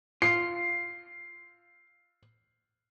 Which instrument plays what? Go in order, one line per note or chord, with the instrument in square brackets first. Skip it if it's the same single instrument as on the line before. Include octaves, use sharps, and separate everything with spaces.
[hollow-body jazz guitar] F4 [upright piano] C7